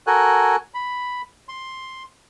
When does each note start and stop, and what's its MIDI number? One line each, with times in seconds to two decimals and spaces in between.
0.07 0.56 66
0.07 0.56 69
0.07 0.56 70
0.07 0.56 80
0.07 0.56 90
0.74 1.22 83
1.49 2.03 84